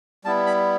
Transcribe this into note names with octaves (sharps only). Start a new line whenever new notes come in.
G3 B3 E4 A5
B5